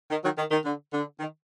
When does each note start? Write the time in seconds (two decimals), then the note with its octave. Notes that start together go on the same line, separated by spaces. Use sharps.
0.11 D#3
0.24 D#3 F#3
0.38 D#3
0.51 D#3
0.65 D3
0.92 D3
1.20 D#3